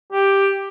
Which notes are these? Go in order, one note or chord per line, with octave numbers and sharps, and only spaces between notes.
G4